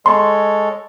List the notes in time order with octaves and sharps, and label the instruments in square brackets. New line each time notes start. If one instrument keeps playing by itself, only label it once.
[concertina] G#3 A4 C#5 [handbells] C6